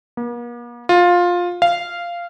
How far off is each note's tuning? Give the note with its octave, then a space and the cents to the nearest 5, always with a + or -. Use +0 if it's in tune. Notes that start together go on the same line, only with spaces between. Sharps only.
A#3 +45
F4 +15
F5 -10